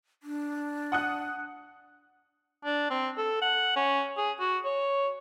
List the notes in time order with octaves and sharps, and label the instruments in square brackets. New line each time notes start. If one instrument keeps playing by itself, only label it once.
[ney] D4
[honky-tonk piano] F#5 D#6 F#6
[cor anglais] D4
C4
A4
F#5
C#4
G#4
F#4
C#5